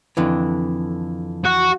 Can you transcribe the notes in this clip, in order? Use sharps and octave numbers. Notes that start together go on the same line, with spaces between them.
F2 D3 E3
F#4